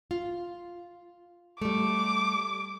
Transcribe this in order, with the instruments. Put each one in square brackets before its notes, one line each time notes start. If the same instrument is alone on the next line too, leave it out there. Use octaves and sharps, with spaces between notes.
[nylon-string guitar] F4
[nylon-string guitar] G3 A3 [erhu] D6